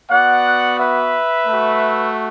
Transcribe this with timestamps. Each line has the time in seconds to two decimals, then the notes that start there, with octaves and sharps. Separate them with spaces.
0.11 B3 F#4 D5 F#5
0.79 B4 E5
1.47 A3 F#4